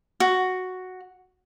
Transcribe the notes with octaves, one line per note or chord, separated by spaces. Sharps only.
F#4